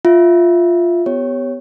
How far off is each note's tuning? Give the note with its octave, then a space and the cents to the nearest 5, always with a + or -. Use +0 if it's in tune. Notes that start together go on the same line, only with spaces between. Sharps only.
F4 +0 E5 +0
B3 +20 G4 +0 C#5 +0